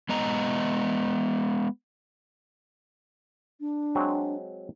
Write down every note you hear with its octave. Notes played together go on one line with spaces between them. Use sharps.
G#3 B3 D#5 A#5
D4
F#3 G#3 C4